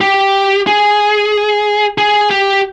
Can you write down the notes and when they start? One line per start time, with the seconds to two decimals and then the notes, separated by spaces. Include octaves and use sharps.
0.01 G4
0.67 G#4
1.98 G#4
2.31 G4